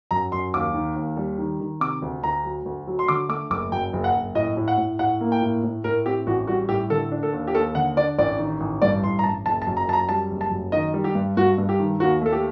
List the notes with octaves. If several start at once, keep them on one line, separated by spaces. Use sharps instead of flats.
F#2 A#5
F#2 C6
D#2 D6
D#3
D#2
G3
D#3
D#3
C3 D6
D2
D2 A#5
F#3
D2
F#3
C6
D3 D6
A3 D6
F#1 D6
F#2 G5
F#1
F#5
F#1
A2 D#5
A2
F#5
A2
A2 F#5
A#3
G5
A2
A2
A2 A#4
C4 G4
A1 F#4
G3 F#4
A2 G4
D3 A4
D4
A4
D#2
G4
D#2 A4
D3 F#5
D4 D5
A1 D5
D#3
A1
G2 D5
A1 C6
A#5
A1 A5
F#1 A5
A5
F#2
A#5
F#2 A5
A#5
G3 A5
F#1
A5
F#2
D#3 D#5
G3
G4
G2
G2 F#4
G2
G4
D#3
D#2 F#4
A3 A4
G4